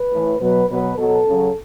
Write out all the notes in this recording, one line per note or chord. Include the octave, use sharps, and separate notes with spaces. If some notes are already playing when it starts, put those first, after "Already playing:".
Already playing: B4
A2 E3
B2 F#3 B4
B2 F#3 B4
B2 F#3 A4
C#3 F#3